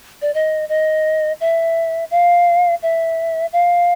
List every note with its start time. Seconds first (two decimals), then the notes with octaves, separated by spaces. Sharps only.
0.22 D5
0.34 D#5
0.69 D#5
1.41 E5
2.11 F5
2.82 E5
3.53 F5